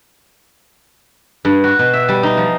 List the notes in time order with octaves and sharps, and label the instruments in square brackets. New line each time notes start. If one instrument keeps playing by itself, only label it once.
[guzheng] G2
F#4
B2
E5
G3
D#4
F3